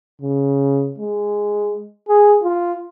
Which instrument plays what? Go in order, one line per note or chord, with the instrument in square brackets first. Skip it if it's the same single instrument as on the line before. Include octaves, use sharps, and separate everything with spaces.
[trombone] C#3
G#3
G#4
F4